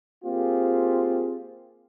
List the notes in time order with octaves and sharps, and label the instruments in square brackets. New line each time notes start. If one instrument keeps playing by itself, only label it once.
[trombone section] A#3 C4 F4 G4 G#4